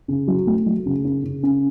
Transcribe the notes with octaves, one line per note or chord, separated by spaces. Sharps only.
C#3
F#3
A3
F#3
C#3
C#4
C#3
C#4